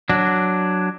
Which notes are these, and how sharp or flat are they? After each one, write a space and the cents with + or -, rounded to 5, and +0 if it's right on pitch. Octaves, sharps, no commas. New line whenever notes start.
F#3 +0 D4 +0